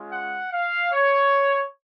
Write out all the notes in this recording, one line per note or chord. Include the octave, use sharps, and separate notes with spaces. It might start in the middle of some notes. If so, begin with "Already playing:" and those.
Already playing: G#3 C#4 F4
F#5
F5
C#5